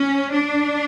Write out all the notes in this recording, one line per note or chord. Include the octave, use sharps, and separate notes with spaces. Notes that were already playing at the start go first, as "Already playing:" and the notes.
Already playing: C#4
D4